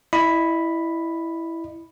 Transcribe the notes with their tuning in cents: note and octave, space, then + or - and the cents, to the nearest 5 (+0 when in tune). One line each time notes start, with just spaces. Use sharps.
E4 +0 D#5 -35 B5 +0